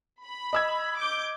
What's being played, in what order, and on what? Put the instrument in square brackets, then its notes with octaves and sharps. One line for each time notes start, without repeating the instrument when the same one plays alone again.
[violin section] B5
[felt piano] D#5 E6 G#6
[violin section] D6 G6